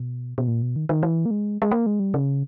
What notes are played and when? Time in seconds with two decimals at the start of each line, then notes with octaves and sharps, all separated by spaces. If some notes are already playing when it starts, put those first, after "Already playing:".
Already playing: B2
0.38 B2
0.48 A#2
0.62 B2
0.76 D#3
0.89 D#3
1.03 E3
1.26 A#3
1.31 G#3
1.62 G#3
1.71 A#3
1.86 G#3
2.00 G3
2.14 C#3